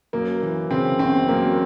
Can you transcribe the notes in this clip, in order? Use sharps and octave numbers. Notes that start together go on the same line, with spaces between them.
F#2 A#3
E3
C#3 C4
G1 C4
F#2 A#3